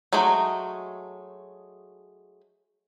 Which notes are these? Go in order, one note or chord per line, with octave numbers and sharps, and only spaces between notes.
F#3 G#3 A3 D#4